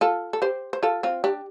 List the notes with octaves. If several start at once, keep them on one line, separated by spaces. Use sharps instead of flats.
F4 A4
A4
G4 C5
C5
F4 A4
C4 F4
D4 G4